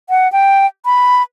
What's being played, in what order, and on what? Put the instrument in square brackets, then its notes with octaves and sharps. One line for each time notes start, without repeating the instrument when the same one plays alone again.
[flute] F#5
G5
B5